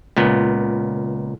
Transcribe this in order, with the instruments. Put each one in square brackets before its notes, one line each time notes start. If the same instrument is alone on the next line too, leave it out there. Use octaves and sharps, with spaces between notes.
[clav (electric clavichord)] C#2 A#2 B3